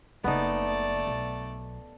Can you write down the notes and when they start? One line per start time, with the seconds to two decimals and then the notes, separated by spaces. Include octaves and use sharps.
0.24 F#1 C#3 A3 B3 D#4 D5
1.07 B1